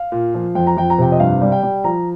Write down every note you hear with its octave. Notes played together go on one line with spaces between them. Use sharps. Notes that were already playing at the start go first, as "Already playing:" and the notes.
Already playing: F5
A#2
F3
F2 G5
A#5
F2 G5
A#5
C3 G5
D#5
G2 F5
G3
G5
G3
F3 A#5